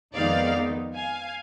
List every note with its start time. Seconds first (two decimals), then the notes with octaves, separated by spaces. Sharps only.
0.15 F2 D#3 G#3 B3 D#4 D5 F5
0.94 F5 G#5